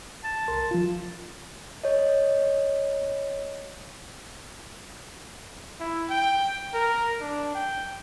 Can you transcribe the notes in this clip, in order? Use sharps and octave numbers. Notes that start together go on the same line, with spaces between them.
A5
C2 A#4 C6
F3 F4
C#5 D#5
E4
G5
A#4
D4
G5